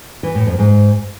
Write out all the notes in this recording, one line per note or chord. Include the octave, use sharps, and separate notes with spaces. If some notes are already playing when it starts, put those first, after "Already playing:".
E3
A2
F2
G#2